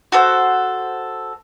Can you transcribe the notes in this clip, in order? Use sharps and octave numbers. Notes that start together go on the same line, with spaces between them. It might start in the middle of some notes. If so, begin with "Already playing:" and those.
F#4 A4 C5